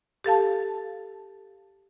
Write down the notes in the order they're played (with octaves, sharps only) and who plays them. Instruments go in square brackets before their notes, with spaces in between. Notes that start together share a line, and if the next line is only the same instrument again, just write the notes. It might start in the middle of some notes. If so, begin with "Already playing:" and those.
[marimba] G4 A4 F5 A5